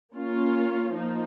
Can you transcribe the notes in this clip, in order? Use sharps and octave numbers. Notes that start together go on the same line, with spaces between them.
A#3 C#4 F4
F3 A#3 D#4